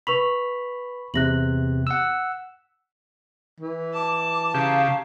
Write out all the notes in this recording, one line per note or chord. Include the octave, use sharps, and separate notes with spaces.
B4 B5 C#6 F7
E2 C3 F#6 A#6 F#7
F#5 E6
E3
A5 D6
C#3 G4 F5 A#5